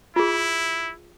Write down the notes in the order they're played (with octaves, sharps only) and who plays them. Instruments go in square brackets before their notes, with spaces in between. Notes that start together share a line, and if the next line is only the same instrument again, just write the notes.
[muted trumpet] E4 [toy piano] F4 G#4